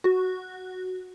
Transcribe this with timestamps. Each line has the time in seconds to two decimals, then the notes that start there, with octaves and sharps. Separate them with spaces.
0.04 F#4